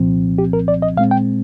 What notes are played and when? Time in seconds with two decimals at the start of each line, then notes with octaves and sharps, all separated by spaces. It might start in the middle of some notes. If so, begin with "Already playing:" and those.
Already playing: C2 A#2 F3 C4
0.38 G4
0.53 A#4
0.68 D5
0.82 D#5
0.96 A#2 G#3 C4 F5
1.11 G5